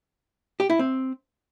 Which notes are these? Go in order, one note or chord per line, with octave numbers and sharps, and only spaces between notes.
G4
E4
C4